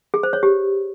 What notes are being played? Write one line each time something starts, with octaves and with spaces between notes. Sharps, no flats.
G#4
C5
C#5
G4